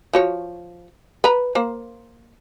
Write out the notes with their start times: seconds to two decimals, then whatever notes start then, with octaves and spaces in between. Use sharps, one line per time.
0.13 F3 F#4 C#5
1.24 B4 A#5
1.55 A#3 C5